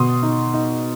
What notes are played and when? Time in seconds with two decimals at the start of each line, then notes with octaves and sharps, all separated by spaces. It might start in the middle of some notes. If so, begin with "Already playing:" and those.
Already playing: B2 C6 D#6
0.22 D#4
0.54 D#4